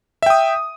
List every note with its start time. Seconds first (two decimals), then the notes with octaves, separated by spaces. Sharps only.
0.23 E5
0.26 G5
0.30 D#6